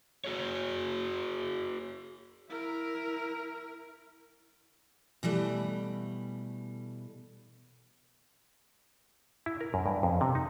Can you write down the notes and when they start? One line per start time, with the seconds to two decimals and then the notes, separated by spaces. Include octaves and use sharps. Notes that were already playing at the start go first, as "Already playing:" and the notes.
0.25 F#4 G#4 C#5
2.50 E4 A#4
5.23 B2 E3 G3 A3
9.46 E4
9.61 A#4
9.74 F#2
9.86 G2
10.03 F2
10.21 C3
10.35 D#4